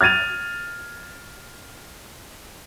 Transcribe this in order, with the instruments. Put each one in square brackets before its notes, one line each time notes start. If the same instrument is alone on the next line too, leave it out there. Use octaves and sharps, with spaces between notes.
[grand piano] F6 G#6 A6 D#7 F7